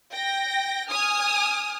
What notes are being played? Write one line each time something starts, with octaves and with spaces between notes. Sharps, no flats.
G5 A#6
G#5 D#6 F6